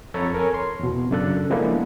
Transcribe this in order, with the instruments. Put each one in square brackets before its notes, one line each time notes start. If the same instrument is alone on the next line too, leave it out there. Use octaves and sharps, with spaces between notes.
[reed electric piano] F2 A4 C#5 A#5 B5
A#4 C#5 G#5
C6
E2 B2
F#2 C#3 D4 A4 F#6
F3 G#3 A#3 B3 D4 E4